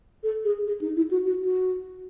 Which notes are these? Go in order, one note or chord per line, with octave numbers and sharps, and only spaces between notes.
A4
G#4
G#4
D#4
E4
F#4
F#4
F#4